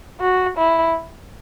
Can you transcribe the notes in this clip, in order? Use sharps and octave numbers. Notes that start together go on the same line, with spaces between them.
F#4
E4